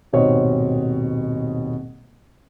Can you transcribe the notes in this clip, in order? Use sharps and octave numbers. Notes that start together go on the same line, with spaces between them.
D#1 G#2 B2 C4 C#5 D#5